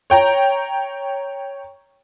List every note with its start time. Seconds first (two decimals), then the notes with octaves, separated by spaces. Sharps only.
0.10 C#5 G5 A#5